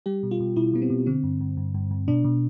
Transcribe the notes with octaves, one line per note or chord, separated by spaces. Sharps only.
G3 G4
B2
F4
B2
B2 E4
B2 B3
C4
B2
D3 C4
G2
G2
G2
G2
G2
B2 D4
B2